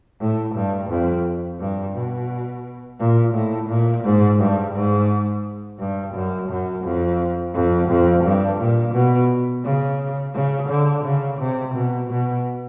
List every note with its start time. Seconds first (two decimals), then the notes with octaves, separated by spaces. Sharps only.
0.20 A2
0.55 G2
0.90 F2
1.60 G2
1.95 B2
3.00 A#2
3.34 A2
3.69 A#2
4.04 G#2
4.39 G2
4.75 G#2
5.79 G2
6.15 F#2
6.49 F#2
6.85 F2
7.54 F2
7.89 F2
8.24 G2
8.60 A#2
8.94 B2
9.64 C#3
10.34 C#3
10.70 D3
11.05 C#3
11.39 C3
11.75 B2
12.10 B2